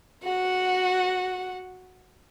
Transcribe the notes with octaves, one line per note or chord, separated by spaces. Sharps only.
F#4 F#5